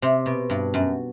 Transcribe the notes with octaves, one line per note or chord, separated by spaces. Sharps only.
C3
B2
G2
F#2